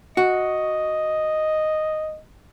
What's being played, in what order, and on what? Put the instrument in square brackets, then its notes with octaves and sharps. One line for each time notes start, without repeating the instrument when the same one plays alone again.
[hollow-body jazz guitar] F#4 [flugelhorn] D#5